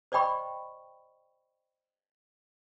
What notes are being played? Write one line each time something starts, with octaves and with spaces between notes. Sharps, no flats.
C5 D5 D#5 G5 B5 C#6